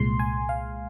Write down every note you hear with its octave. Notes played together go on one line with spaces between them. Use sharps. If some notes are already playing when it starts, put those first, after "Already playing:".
Already playing: C2 A#2 G#3 C6
G#5
F5